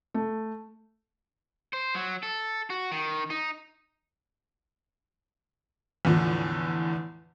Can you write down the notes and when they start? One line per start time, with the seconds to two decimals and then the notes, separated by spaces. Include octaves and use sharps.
0.14 A3
1.73 C5
1.95 F#3
2.23 A4
2.70 F#4
2.92 D#3
3.30 D#4
6.05 E2 A2 D3 F3